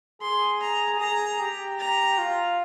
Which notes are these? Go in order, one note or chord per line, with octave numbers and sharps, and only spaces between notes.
G#4 C6
A#5
G#4 A#5
G4
A#5
F4